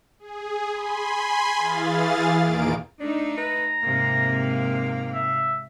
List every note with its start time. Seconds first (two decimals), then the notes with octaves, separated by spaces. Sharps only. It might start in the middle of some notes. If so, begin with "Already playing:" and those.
0.19 G#4
0.72 G#5 B5 C6
1.58 E3 G#4 F5 A6
2.41 E2 A#2 D#3 A#3 D7
3.00 A3 D4 D#4
3.38 B4 A#5
3.83 G#2 C3 A#3 F5
5.14 E5